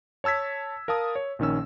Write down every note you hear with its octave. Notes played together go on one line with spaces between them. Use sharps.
C#5 A5 E6 G#6 B6
A#4 F5 A5 D#6
C#5
A#1 D#3 C#4 E6